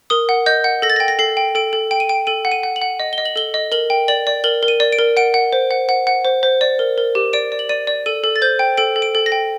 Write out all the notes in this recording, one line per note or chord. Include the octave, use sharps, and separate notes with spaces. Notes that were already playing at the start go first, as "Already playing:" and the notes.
A#4 D#6
F#5
D#5 G6
F#5
A4 A#6
A6
A#6
G5
A#6
A4 C7
G5
A4 D7
A4
G5 D7
D#7
G5 D7
A4 D#7
F#5
D#7
F#5
F#7
F#5
D#5
G7
D#5
F#7
A4 G7
D#5
A#4 F#7
G5
D5 F#7
D5
A#4 F#7
A#4
D#7
D5
D7
A#4
F#5 D7
F#5
C5
F#5
F#5
F#5
C5
C5
D5
A#4
A#4
G4
D5 D7
D5
F#7
D5 D#7
D5
A4 D#7
A4
A6
C5 G6
G5
A4 D7
A4
D7
A4
A#6
G5